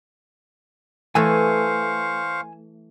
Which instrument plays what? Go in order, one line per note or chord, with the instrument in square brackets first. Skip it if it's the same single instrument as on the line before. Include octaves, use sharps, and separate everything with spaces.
[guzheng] E3 A3 [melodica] C5 F5 C#6 [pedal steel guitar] G#5 E6 F#6